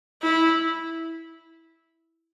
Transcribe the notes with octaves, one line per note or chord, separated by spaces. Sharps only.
E4